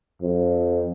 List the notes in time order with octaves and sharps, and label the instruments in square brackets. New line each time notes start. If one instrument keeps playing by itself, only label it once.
[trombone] F2